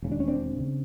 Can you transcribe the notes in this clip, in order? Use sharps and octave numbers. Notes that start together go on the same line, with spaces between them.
E1 D#2 C#3
D4
C#4
C4 D4
D#2 C#3